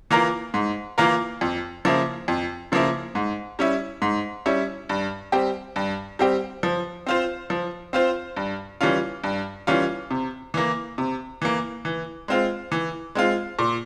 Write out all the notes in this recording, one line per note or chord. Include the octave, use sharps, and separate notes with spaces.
E3 A#3 F4 A#4
G#2
E3 A#3 F4 A#4
F2
C#3 F3 A#3 E4
F2
C#3 F3 A#3 E4
G#2
G3 C#4 E4
G#2
G3 C#4 E4
G2
G3 C4 G4
G2
G3 C4 G4
F3
C4 F4 C5
F3
C4 F4 C5
G2
E3 G3 C#4 F4
G2
E3 G3 C#4 F4
C3
E3 A#3
C3
E3 A#3
E3
G#3 C4 F4
E3
G#3 C4 F4
A#2